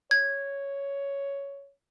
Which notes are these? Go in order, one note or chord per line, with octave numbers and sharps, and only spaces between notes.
C#5 G#6